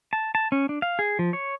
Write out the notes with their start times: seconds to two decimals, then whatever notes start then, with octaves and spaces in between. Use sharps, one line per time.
0.13 A5
0.35 A5
0.52 C#4
0.69 D4
0.82 F5
0.99 G#4
1.19 F3
1.33 C#5